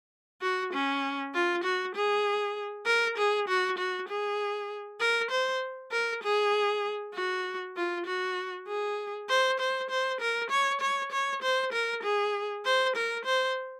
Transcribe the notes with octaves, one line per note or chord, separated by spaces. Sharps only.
F#4
C#4
F4
F#4
G#4
A#4
G#4
F#4
F#4
G#4
A#4
C5
A#4
G#4
F#4
F4
F#4
G#4
C5
C5
C5
A#4
C#5
C#5
C#5
C5
A#4
G#4
C5
A#4
C5